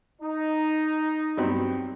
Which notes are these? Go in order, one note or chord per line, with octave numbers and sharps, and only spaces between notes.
D#4
G2 F#3 C4